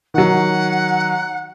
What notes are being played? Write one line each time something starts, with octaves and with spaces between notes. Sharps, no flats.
D#3 F#3 F#5